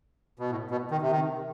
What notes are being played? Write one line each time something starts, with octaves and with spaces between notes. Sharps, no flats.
B2
A2
B2
D#3
C3
D#3